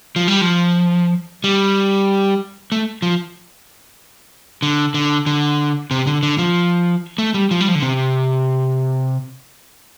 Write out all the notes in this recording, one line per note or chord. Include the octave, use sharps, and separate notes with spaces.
F3
G3
F3
G3
A3
F3
D3
D3
D3
C3
D3
D3
F3
A3
G3
F3
G3
F3
D3
C3